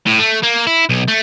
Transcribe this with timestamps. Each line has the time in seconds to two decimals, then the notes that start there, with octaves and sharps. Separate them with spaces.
0.06 A2
0.19 A3
0.43 A#3
0.67 E4
0.89 B1
1.08 A3